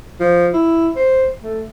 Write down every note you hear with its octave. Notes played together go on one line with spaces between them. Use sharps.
F3
E4
C5
A3